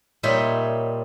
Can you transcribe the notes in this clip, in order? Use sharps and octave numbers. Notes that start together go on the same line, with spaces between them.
A#2 G3 D#4 C#5 E5 C6